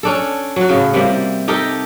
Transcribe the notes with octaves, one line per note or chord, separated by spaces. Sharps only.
C#4 D4 A4
F#3 F#4
A2 C#3
C3 G3 A#3
D#4 G4 A4 A#4